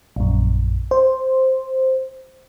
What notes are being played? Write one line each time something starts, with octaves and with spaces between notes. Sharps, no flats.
A#1 F#2
C5